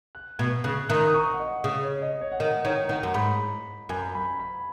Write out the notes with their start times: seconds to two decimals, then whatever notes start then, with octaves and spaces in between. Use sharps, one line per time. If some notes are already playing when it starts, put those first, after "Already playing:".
0.15 F#6
0.39 B2 G#6
0.64 C#3 F#6
0.89 D#3 F#6
1.07 D#6
1.14 C#6
1.33 F#5
1.40 D#5
1.64 C#3
1.83 C#5
2.02 D#5
2.21 C#5
2.32 F#5
2.39 D#3 D#5
2.65 D#3 C#5
2.89 D#3 F#5
3.03 F#2
3.14 G#2 B5
3.89 F#2 G#5
4.15 B5
4.39 B5